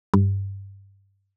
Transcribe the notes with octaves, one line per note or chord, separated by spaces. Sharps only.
G2